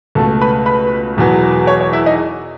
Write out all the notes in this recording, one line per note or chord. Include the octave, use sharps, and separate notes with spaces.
C#2 B2 A3 A4 A5
B4 B5
B4 B5
E1 E2 B2 F#3 B3
C#5
C#5
E4 E5
D#4 D#5